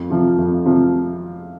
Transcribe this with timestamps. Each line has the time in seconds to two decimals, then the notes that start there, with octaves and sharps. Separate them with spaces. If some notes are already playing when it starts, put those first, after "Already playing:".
Already playing: F2
0.10 C3 F3
0.38 F2
0.66 C3 F3